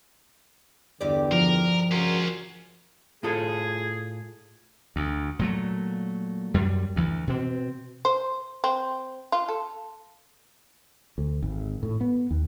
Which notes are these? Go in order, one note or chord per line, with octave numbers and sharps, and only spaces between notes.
E2 G2 D3 G4 D5
F3 A#4
C#3 C#4 F4 F#4 A#4
A2 F4 G#4 A4
D2
A#2 F#3 A3
F#2 G3
D2 E3
B2 C4
C5
C4
F4
A4
D2
G#1
A2
B3
D#2